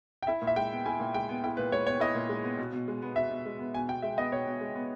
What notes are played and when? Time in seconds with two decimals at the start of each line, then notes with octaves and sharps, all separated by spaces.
0.23 G5
0.27 E4 E5
0.42 A#2
0.47 E5
0.56 G#3 G5
0.71 B3
0.86 E4 G#5
1.00 A#2
1.14 G#3 G5
1.29 B3
1.44 E4 G5
1.57 A#2 B4
1.72 G#3 C#5
1.87 B3 C#5
2.00 E4 D#5
2.15 A#2
2.29 G#3
2.44 B3
2.58 B2
2.72 B2
2.88 G#3
3.02 B3
3.16 B2 E5
3.30 B2
3.46 G#3
3.59 B3
3.74 B2 G#5
3.88 B2 G5
4.02 G#3 E5
4.17 B3 D#5
4.32 B2 C#5
4.47 B2
4.61 G#3
4.75 B3